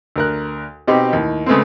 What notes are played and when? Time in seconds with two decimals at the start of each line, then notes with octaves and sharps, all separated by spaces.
0.16 D2 A#4 F#6
0.88 B2 C4 D#4 G4
1.13 D#2 A2
1.46 C#3 G#3 A3 B3 C4